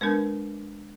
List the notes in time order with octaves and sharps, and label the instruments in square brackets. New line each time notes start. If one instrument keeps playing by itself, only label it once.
[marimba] G#3 B3 D4 [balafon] A#4 B4